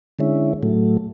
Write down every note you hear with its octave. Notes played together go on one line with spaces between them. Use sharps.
D3 G#3 C#4 E4
A2 F#3 A3